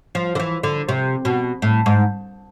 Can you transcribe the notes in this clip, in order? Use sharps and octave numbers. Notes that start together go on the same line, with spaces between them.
F3
D3
E3
D3
C3
B2
A2
G#2